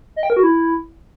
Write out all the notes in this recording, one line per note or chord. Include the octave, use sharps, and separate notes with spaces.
D#5
G5
A#4
F#4
E4